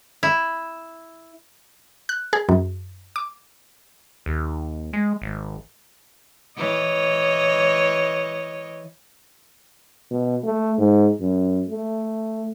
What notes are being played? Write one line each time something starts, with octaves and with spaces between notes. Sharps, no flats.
E4
F#6
G#4
F#2
D6
D#2
G#3
G#1
E3 C#5 D#5
B2
A3
G#2
F#2
A3